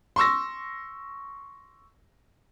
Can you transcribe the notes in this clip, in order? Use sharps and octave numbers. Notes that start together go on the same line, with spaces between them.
C6 C#6 E6 A#6